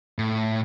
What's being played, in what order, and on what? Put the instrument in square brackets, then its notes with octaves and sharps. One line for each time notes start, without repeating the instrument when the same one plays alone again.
[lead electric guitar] A2